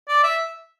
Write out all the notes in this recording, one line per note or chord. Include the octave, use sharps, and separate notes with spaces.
D5
E5